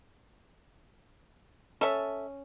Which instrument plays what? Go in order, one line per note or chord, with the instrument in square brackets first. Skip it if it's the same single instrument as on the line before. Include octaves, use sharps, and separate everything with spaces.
[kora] C#4 [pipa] A4 E5